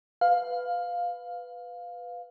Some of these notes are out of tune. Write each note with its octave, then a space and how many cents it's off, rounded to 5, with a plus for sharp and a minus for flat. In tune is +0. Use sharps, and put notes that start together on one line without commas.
B4 +10 F5 +10